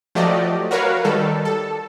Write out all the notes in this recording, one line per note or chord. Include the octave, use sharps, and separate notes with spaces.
F3 F#3 A3 G4 D5 D#5
F#4 A#4 B4 C#5 F5
D#3 G3 A4
A4